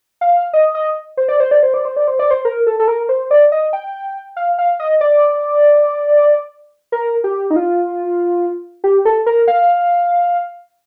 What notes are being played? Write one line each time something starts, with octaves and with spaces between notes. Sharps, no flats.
F5
D#5
D#5
C5
D5
C5
D5
C5
D5
C5
D5
C5
D5
C5
A#4
A4
A4
A#4
C5
D5
D#5
G5
F5
F5
D#5
D5
A#4
G4
D#4
F4
G4
A4
A#4
F5